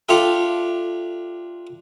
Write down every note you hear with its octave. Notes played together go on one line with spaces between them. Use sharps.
D4 F4 G4 A4 E5